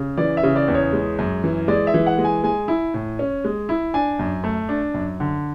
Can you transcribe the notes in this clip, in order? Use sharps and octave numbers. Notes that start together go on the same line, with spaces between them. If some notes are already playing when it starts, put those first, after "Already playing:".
Already playing: C#3
E3 D5
E5
C#3
D5
E2
C#5
G#3
F#2
E3
G#3 D5
E5
E3
F#5
G#3
G#5
G#3 G#5
E4
A2
C#4
G#3
E4
D4 G#5
F#2
A3
D4
F#2
D3